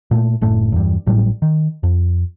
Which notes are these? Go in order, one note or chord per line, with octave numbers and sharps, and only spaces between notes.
A#2 A3
F#1 A2 A3
E2 G2
G#1 A2 F#3 G3
D#3
F2